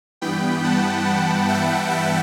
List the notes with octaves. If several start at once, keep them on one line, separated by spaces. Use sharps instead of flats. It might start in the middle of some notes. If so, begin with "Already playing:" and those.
G2 E3 G3 B3 G5 B5
F#5 A5
F#5 A5
E5 G5
E5 G5